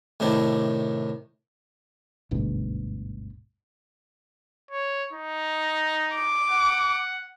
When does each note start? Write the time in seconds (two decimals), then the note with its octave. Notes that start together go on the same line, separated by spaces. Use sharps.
0.20 A2 C3 D#3 D4 E4
2.31 G1 D2 G#2 B2
4.71 C#5
5.13 D#4
6.15 D6
6.50 F#5